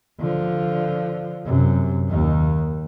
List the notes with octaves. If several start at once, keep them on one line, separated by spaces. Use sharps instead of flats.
D3 F3
F#2 C3
D#2 D#3